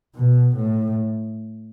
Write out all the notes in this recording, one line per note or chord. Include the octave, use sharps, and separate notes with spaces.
B2
A2